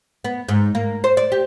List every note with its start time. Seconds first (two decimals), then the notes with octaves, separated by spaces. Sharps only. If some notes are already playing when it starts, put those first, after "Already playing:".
0.24 B3
0.49 G#2
0.75 A#3
1.04 C5
1.17 D5
1.32 G4